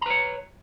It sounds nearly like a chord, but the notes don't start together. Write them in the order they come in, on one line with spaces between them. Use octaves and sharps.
A#5 B4 C#5